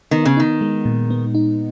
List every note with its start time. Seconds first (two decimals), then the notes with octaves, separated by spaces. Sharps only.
0.11 D#3 B3
0.25 C#3
0.37 D#3 D#4
0.61 G#3
0.85 A#2
1.10 B3
1.35 D#4